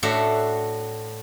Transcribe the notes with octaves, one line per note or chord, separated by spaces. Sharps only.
A2 D4 F#4 E5